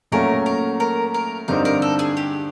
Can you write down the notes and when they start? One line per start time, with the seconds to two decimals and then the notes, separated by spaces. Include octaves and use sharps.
0.12 A#2 F#3 A3 C#4 A#4
0.46 A#4
0.80 A#4
1.14 A#4
1.48 G2 D3 G3 C4 D#4 A#4
1.65 A#4
1.82 A4
1.99 G#4
2.17 G4